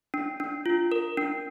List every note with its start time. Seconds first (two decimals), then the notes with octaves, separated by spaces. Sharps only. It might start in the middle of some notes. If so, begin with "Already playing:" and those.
0.14 D4
0.40 D4
0.66 F4
0.92 A#4
1.17 D4